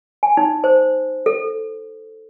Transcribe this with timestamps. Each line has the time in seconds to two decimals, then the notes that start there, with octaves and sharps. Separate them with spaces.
0.23 G#5
0.37 D#4
0.64 C5
1.26 A4